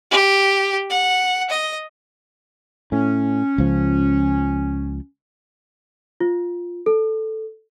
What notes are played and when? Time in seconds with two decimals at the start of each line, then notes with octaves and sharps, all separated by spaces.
0.11 G4
0.90 F#5
1.50 D#5
2.92 A2 C#4
3.58 C#2 F3
6.20 F4
6.86 A4